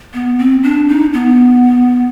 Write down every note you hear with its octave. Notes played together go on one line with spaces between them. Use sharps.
B3
C4
D4
D#4
B3